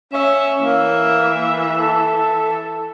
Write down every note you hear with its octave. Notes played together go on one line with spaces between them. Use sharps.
C#4 E5
E3 A#3 E5
A4